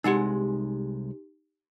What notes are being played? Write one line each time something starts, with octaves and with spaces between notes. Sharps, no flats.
C2 G#3 D#4 G4 F#5